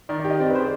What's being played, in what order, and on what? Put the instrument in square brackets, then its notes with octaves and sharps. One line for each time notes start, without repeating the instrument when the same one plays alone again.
[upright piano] D#3 [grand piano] D5
[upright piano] G4 [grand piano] D5
[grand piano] D#5
[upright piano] C4 [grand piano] D5
[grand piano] B4
[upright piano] C5
[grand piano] G#4